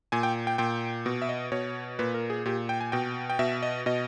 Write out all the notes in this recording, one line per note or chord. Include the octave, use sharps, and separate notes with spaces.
A#2 G#5
G5
G5
A#2 G5
B2
E5
D#5
B2 C#5
A#2 B4
A#4
G#4
A#2 G4
G5
G#5
B2 G5
G5
B2 E5
D#5
B2 D#5